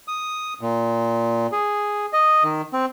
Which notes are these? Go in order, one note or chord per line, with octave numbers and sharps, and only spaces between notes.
D#6
A#2
G#4
D#5
D#3
C4